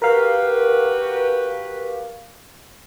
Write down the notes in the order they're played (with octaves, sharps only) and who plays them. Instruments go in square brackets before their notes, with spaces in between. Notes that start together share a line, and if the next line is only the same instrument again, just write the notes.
[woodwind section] F#4 G4 B4 [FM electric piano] A#4 F5